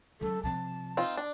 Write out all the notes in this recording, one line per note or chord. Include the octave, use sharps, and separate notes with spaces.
C#3 F#3 A4
C3 F3 A5
C4 D#4 F4
D4